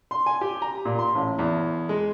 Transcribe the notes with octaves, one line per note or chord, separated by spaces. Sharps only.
C6
G#5
G4
A#5
A#2
C6
A1
E2
G#3